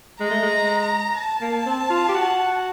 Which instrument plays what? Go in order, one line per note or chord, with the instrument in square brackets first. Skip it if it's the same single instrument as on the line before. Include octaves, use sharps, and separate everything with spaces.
[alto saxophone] G#3 [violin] A#5
[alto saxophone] A3
G#3
[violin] A5
[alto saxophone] A#3
C4
F4
G4
F#4